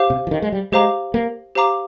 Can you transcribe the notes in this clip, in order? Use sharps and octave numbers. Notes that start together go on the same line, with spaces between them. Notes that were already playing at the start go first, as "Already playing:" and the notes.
Already playing: G4 C5 F5 D6
C3
F3
D#3
G#3
G3
G#3 G4 C5 F5 A#5 D6
A#3
G4 C5 F5 A#5 D6